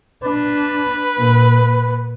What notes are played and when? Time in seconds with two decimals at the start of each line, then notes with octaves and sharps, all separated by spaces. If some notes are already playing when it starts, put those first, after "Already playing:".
0.23 D4 B4
1.18 A#2